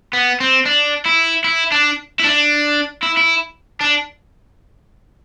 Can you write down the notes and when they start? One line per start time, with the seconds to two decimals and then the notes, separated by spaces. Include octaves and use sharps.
0.13 B3
0.40 C4
0.66 D4
1.06 E4
1.44 E4
1.72 D4
2.20 E4
2.24 D4
3.03 E4
3.17 E4
3.81 D4